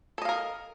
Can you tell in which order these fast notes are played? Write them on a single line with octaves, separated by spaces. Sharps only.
A4 D#5 F5 A#4